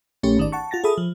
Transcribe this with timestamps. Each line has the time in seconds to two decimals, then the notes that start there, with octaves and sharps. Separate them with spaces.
0.23 A#1 A3 C#4 G4
0.37 G#1 D#3 D5
0.52 F#5 A5 C#6
0.71 F4 F#5 A6 A#6
0.84 G#4 A4 E5 B5 D#6
0.98 F3